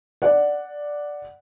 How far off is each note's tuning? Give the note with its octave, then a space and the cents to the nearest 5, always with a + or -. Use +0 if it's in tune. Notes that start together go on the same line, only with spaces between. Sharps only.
D5 +0 F#5 +0